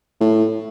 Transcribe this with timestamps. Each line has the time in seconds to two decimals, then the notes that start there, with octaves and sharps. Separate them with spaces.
0.20 A2